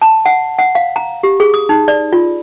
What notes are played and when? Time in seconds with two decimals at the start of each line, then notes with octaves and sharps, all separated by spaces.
0.02 A5
0.26 F#5
0.59 F#5
0.75 F5
0.96 A#5
1.23 G4
1.40 G#4
1.54 D#6
1.69 D#4
1.88 D5
2.13 F4